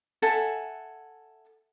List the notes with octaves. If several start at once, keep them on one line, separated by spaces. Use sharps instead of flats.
A4 E5 F#5 G#5